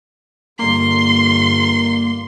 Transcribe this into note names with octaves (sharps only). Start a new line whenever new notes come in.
G1 A#3 C6